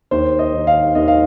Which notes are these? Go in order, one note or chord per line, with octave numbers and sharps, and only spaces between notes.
D#2 C5
D#5
D#3
F5
D#2 D#5
F5